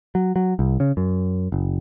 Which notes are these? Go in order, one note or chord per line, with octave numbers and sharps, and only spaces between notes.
F#3
F#3
C2
C#3
F#2
F#1